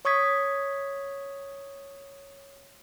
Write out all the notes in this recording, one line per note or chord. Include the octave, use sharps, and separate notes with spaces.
C#5 C#6 D#6 G#6 B6